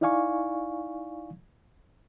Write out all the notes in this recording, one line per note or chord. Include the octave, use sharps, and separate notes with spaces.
D#4 E4 D5 F5 G#5 C#6